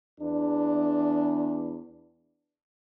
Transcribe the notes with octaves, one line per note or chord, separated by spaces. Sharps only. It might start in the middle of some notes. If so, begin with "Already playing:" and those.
E2 D4